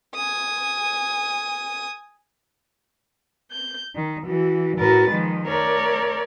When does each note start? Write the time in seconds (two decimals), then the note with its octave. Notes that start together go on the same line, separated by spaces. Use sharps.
0.15 G#5 D#6
3.51 G6
3.95 D#3
4.26 E3 F#4
4.77 A2 F#4 A#4 B4 A6
5.10 D#3 F3 G#3
5.48 A3 A#4 C#5 D5